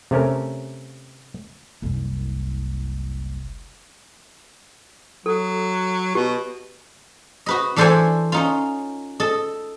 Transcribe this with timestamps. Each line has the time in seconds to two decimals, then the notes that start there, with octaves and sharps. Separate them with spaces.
0.11 C3 A3 C#4 A#4
1.82 F#1 C2
5.26 F#3 A4
6.15 B2 G4
7.46 F#4 B4 D#5
7.76 E3 D4 A4 C5 F#5 G#5
8.32 C#4 D#4 F4
9.20 A4 D#5 A5